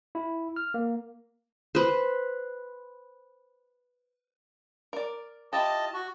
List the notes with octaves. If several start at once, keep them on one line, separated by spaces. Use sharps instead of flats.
E4
F6
A#3
B4 C5
A#4 D5
E4 F4 G4 D#5 A5
F#4